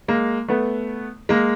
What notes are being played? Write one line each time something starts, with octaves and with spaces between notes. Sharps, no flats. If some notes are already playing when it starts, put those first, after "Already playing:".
G#3 A#3
A3 B3
G#3 A#3